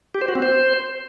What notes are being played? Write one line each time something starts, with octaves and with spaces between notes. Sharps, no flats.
G4
C5
F#4
C4
C5